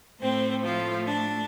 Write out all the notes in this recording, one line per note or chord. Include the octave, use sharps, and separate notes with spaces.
A2 A3 C4 C5
F3 F4
D4